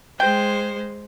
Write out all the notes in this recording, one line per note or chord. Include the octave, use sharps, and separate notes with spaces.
G#3 C5 G5